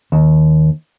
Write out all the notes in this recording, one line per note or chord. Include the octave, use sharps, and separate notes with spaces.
D#2